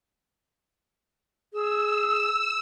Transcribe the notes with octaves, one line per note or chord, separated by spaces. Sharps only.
G#4 E6